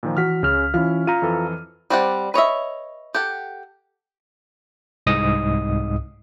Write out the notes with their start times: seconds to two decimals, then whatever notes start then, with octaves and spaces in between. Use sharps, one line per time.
0.03 A#2 D#3 F3
0.17 E3 F#4 F6 B6
0.43 C#2 C#3 C#4 F6
0.74 E3 C#4 E4 F4 F6
1.07 F4 A#5 F6 D#7
1.22 F2 E3 A4
1.90 G3 C4 D5 F#5
2.34 B4 C#5 D#5 E5
3.15 G4 A4 F#5
5.07 C2 G#2 D#5 D#6